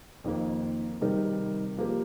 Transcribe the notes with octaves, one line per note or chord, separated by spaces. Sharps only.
F2 D#3 A#3
C3 D#3 G3 D#4 A#4
F3 A#3 G4 A#4